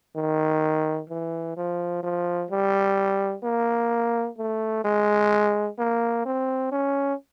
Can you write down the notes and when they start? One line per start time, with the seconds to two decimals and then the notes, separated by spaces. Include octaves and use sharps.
0.16 D#3
1.10 E3
1.57 F3
2.03 F3
2.51 G3
3.44 A#3
4.38 A3
4.84 G#3
5.79 A#3
6.26 C4
6.72 C#4